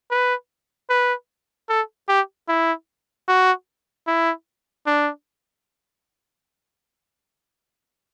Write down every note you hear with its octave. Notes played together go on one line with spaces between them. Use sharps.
B4
B4
A4
G4
E4
F#4
E4
D4